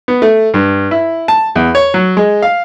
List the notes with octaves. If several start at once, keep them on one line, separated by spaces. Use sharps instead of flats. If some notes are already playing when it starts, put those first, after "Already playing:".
B3
A3
G2
E4
A5
E2
C#5
F#3
G#3
F5